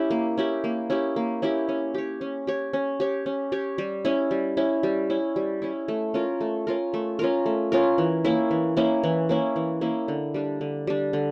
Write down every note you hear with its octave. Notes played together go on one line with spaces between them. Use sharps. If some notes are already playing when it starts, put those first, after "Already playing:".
Already playing: C#4 E4 G4
A#3
C#4 E4 G4
A#3
C#4 E4 G4
A#3
C#4 E4 G4
C#4
G4 C#5
C#4
G4 C#5
C#4
G4 C#5
C#4
G4 C#5
G3
C#4 E4
G3
C#4 E4
G3
C#4 E4
G3
C#4 E4
A3
C#4 F4 A#4
A3
C#4 F4 A#4
A3
C#4 F4 A#4
A3
C#4 F4 A#4
E3
A#3 C#4 E4
E3
A#3 C#4 E4
E3
A#3 C#4 E4
E3
A#3 C#4 E4
D3
G3 D4
D3
G3 D4
D3